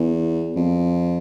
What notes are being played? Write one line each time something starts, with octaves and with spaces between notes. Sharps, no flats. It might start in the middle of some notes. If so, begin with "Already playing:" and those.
Already playing: E2
F2